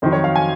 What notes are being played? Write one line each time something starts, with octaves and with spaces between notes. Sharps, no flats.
F2 D#3 F#3 C5
C#5
F5
G#5